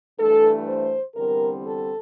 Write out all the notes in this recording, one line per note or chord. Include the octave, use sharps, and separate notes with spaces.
G2 E3 A3 A4
C5
E2 D3 G3 C4 A#4
A4